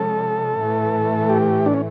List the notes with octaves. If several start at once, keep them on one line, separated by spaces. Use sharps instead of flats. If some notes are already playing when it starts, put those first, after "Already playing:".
Already playing: C3 F3 G#3 C#4 A4
A2 E3 A3
G4
D4
C#4